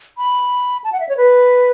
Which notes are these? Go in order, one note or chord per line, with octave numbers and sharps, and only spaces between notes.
B5
A5
F#5
E5
C#5
B4